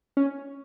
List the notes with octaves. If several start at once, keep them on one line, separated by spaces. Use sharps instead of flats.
C#4